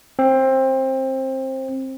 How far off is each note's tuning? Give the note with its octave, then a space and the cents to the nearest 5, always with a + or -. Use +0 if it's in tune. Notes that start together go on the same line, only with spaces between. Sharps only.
C4 +20